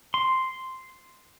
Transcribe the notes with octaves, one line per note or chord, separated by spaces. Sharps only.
C6